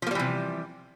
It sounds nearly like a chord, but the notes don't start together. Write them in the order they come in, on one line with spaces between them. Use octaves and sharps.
F3 A#3 G3 E3 C3